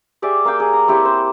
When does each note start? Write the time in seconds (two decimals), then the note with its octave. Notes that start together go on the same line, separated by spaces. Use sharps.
0.22 G4 G#4 D5 E5
0.45 A#3 F5 G5
0.60 G#4
0.73 A#5
0.88 C4 E4 G4 C#5
1.05 C5